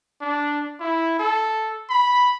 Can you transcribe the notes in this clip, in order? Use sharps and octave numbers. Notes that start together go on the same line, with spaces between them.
D4
E4
A4
B5